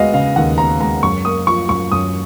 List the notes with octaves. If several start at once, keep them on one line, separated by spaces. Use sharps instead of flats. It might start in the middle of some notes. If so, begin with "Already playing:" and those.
Already playing: G#3 B3 F#4 D#5 F5
C#3 F5
D#2 F#5
B3 A#5
G#3 A#5
F#2 C#6
A#3 D#6
F3 C#6
F#2 C#6
F#2 D#6